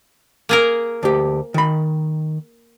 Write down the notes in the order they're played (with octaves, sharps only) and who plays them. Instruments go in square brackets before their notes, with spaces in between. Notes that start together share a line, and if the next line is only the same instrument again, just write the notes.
[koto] A#3 G#4 A#4
[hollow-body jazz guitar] D2 G4
D#3 B5